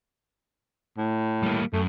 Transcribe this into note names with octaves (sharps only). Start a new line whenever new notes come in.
A2
G3 A#3
F#2 A3